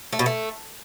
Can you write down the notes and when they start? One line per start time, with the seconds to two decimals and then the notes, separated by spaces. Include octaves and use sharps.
0.13 A3
0.19 B2
0.26 A3